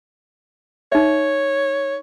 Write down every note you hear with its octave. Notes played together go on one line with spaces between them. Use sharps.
D#4 C#5 E5